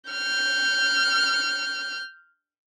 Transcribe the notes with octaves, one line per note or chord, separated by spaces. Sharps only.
F6 G6